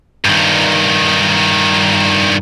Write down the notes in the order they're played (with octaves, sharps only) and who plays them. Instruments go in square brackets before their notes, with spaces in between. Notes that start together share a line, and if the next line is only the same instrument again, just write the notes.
[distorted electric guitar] G2 D#3